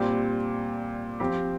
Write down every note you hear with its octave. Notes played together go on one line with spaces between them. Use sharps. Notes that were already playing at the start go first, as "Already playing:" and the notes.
Already playing: A#2 G3 C4 G4
F3 C4 G4